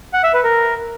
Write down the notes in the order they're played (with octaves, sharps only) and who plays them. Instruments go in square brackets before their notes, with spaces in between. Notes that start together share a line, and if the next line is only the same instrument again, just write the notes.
[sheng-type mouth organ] F#5
E5
B4
A#4